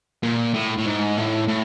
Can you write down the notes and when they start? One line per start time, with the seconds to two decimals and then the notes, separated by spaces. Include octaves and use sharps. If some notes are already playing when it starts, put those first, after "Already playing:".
0.23 A#2
0.54 A2
0.78 A2
0.86 G#2
1.17 A2
1.48 A2